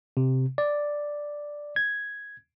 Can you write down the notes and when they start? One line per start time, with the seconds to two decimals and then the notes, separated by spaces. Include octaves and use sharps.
0.17 C3
0.58 D5
1.76 G#6